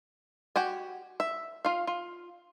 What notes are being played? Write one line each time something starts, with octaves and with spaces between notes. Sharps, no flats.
F#4 G4 G#5
E5
F4 F5
F4